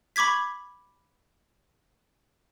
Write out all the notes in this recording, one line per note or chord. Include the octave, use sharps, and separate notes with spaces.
B5 C#6 D6 G#6 B6